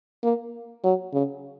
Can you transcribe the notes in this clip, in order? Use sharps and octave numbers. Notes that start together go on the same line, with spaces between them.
A#3
F#3
C#3